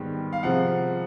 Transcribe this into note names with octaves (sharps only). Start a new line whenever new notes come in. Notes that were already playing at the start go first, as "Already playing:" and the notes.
Already playing: G#2 D#3 G3 B3
F5
C3 F3 G#3 F#5